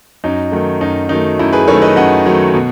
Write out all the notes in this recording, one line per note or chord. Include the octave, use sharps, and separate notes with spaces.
F#2 D#4
D#3 F#3 A3
F#2 D#4
D#3 F#3 A3 D#4
F#2 E4
G#4 B4
D#3 F#3 A3 A4 C#5
B4 D#5
F#2 D#5 F#5
D#3 F#3 A3
B2